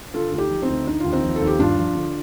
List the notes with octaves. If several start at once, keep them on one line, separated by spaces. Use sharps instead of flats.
D3 F4 A4
D2 A4
D#4 G4
F3
C4 D#4
D2
D3 D#4
D#2 F4
C4 D#4
F3
D#2 A4
G4
G2 D4 F4
F3
D3